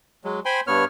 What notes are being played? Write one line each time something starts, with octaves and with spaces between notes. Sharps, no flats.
F#3 G#3
C5 G5 G#5 B5 C6
G2 B3 C#5 F6